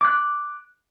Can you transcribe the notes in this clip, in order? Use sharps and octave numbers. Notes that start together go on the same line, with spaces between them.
D6 F#6